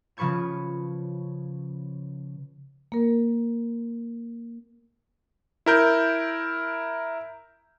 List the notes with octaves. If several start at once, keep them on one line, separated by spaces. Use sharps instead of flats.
C#3 F3 B4 C#6 G#6 E7
A#3 A#4
E4 A#4 G6